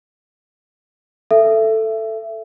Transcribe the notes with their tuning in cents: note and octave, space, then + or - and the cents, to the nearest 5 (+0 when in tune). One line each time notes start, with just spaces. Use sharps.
A4 +5 E5 +20